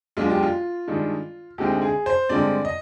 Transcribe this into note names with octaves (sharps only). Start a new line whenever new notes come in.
B1 B2 G#3 D4 F4
G4
F4
G2 D#3 G#3 D4
D2 D3 G#3 C4 D#4 G4
G#4
C5
G2 D3 G#3 C4 D5
D#5